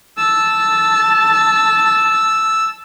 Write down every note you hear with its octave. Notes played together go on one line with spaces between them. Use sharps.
A5 E6